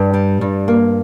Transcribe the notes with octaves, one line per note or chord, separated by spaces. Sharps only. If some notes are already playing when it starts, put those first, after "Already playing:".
Already playing: G2
G3
G2
A#3